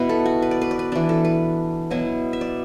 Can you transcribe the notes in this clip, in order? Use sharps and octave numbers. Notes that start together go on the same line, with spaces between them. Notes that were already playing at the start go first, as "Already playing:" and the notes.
Already playing: B2 B3 E4 B4
A4
F#4
B4
D5
B4
D5
B4
E3 D4 D5
A4
B4
B2 F#3 B3 E4
E5
D5